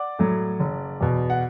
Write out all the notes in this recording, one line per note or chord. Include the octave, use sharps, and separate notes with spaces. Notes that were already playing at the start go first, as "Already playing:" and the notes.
Already playing: D5 F#5
A2 F#3
F#1
E2 B2
F#5